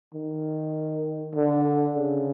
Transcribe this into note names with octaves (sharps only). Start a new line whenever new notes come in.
D#3
D3
C#3